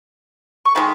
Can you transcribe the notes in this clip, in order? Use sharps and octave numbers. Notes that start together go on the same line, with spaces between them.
C#6
D#3 G#3 B4 B5